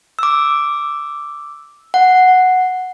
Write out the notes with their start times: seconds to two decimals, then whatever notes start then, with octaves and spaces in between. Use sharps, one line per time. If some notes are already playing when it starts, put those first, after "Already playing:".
0.19 D6 E6
1.94 F#5